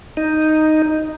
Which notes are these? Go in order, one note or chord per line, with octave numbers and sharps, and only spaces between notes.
D#4